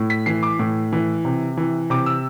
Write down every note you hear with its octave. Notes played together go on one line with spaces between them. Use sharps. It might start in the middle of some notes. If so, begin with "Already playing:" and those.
Already playing: A2
B6
E3 C7
D6
A2
E3
C3
E3
C3 D6
E6